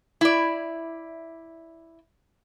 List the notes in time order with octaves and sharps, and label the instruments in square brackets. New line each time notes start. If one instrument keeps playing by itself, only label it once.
[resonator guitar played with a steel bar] E4 D5